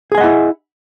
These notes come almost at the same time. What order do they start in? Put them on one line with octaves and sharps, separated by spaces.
G#4 G#5 D#5 F#5 E4